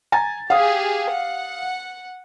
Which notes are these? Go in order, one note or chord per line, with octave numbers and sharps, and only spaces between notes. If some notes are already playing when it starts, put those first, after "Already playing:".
G#5 A#5 A6
G4 G#4 F5 D#6
F#5